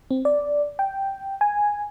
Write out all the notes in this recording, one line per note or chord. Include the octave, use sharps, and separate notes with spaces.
C4
D5
G5
G#5